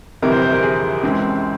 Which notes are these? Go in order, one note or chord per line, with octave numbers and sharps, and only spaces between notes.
G1 F2 C3 E3 A#4
C5
C5
A#4
G#4
C#2 C#3 E3 G#3 C4